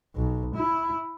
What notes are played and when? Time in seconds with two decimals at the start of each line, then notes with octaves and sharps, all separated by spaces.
0.16 B1
0.55 E4